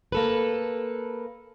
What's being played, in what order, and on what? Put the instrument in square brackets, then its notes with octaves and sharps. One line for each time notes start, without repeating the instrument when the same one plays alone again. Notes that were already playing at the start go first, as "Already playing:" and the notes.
[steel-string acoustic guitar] A#3 A4 B4